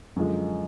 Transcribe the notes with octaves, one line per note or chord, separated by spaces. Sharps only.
F#2 D3 F3 G#3